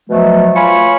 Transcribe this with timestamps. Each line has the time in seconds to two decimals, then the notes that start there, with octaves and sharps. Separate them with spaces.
0.09 B2 F3 F#3 A3
0.55 F4 C#5 G#5 B5 C#6